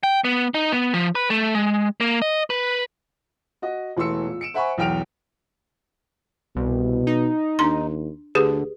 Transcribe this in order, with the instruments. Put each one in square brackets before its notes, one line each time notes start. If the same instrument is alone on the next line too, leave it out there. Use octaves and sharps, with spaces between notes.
[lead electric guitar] G5
B3
D#4
B3
F3
B4
A3
G#3
A#3
D#5
B4
[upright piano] F#4 D#5
E1 E3 A3 C6 E6 C#7
A#2
C#7 D7 E7
C5 E5 F#5 G#5 B5 C#6
B1 E2 G5 F6 D7 F7
[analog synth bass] C2 [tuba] B2
[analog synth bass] D#4
[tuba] D#2 [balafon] D4 A#5 C6
[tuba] D2 [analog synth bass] D3 [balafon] G4 G#4 B4